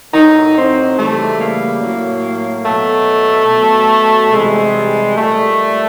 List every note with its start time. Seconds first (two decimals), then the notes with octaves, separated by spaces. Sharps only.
0.13 A2 F#3 D#4
0.55 C4
0.97 C#3 E3 G3 A3
1.38 A#3
1.80 A2 F#3
2.65 B2 F#3 A3
3.48 B2 F#3
4.32 C3 E3 G3 G#3
5.16 A#2 G3 A3